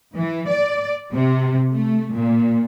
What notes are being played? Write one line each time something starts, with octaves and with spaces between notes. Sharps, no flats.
E3
D5
C3
A3
A#2